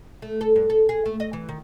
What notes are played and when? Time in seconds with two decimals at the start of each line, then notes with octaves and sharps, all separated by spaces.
0.22 A3
0.41 A4
0.56 G2
0.70 A4
0.89 G#4
1.05 A3
1.20 D#5
1.33 E3
1.49 D#3